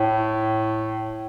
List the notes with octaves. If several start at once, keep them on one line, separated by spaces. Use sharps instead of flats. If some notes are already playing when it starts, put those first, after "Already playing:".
Already playing: A2